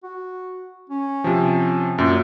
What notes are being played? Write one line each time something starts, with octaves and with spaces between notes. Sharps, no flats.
F#4
C#4
C3 F3
F#2 A#2